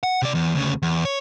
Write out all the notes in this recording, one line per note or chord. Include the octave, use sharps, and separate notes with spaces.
F#5
C3 D5
E2
D2 C#3
E2
C#5